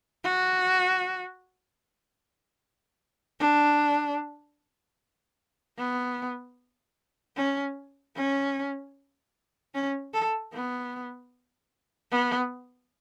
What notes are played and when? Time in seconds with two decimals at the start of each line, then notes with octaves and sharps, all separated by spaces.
0.24 F#4
3.40 D4
5.78 B3
7.36 C#4
8.16 C#4
9.74 C#4
10.13 A4
10.53 B3
12.11 B3